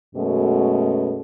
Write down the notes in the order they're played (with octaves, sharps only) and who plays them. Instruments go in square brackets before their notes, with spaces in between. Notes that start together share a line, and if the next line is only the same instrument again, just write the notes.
[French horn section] F#2 B2 G#3 A3 C#4